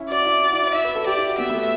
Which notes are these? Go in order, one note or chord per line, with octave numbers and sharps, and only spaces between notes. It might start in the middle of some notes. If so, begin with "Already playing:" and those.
Already playing: C#4 E4
F#4 D5
E4
F#4
E4
E4
E4 E5
B4
A4
G4 D5
E4
F#4
B3 E5
B3
A3